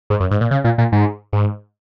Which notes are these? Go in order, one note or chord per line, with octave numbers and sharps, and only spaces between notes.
G#2
F#2
G#2
A#2
C#3
A#2
A#2
G#2
G#2